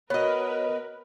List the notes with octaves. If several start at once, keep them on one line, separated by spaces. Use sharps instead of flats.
B3 F#4 A#4 B4 C#5 D#5